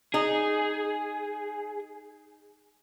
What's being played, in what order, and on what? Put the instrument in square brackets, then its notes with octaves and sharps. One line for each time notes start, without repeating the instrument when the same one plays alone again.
[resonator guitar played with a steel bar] D#4 [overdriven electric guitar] G#4